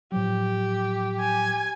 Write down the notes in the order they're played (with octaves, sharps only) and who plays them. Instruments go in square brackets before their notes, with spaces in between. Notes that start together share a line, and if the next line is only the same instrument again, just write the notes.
[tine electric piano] A2 F3 F#3 [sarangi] G4
[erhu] G#5